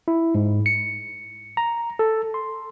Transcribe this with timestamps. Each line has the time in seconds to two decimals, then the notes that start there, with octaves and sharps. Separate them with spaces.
0.08 E4
0.35 G#2
0.66 C#7
1.57 A#5
1.99 A4
2.34 C6